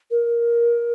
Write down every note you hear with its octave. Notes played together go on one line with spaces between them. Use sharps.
A#4